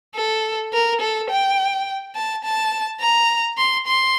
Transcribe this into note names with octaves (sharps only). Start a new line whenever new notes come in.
A4
A#4
A4
G5
A5
A5
A#5
C6
C6